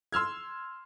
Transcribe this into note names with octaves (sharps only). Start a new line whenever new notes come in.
C6 E6 F6 G#6